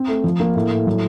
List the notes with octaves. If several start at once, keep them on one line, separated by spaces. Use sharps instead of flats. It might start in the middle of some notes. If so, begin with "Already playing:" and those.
Already playing: C4
A3
F3
A#3
A2
A2
F#3